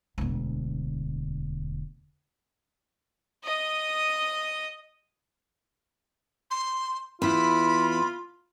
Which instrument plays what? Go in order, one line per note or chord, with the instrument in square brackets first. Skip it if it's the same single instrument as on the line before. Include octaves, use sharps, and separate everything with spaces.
[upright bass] E1 D2
[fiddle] D#5 D#6
[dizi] C6
[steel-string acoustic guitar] E2 E4 [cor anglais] F4 [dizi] B5